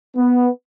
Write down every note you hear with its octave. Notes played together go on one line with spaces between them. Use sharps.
B3